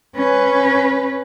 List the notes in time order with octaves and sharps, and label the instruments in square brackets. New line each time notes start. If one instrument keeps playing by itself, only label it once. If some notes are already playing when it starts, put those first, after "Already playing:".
[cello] C#4 B4